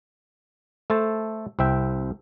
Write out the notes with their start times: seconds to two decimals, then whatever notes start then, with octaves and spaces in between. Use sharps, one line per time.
0.90 A3 A4 C5 A5
1.59 C2 C4 E5 G5